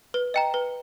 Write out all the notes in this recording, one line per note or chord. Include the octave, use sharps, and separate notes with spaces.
B4
D#5 G5 A#5
B4